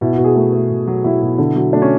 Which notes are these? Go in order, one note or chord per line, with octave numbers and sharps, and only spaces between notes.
B2 E4
F#4
B2
G#4
A3
A3
B2
F#3
F#3 E4
B2
D3
F#3
A3 D4
C#4